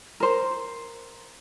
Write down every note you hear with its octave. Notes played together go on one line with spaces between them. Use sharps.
A#4 C5